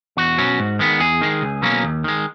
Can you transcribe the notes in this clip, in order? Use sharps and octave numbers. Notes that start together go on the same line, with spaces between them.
E2 F#4
B2 F#3 C#4
G#2
D#3 G#3 B3
E2 G#4
D#3 G#3
C#2
B2 F#3 A#3 C#4
D#2
D#3 G#3